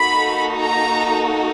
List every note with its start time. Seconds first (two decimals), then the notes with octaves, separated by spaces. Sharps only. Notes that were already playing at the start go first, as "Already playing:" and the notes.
Already playing: A#3 D#4 F#4 A4 B5
0.61 A#5